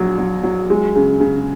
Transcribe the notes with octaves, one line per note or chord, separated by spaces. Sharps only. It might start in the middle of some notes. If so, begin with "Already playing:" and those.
Already playing: A#1 F#3
F#3
F#3
G#3
C#3
C#3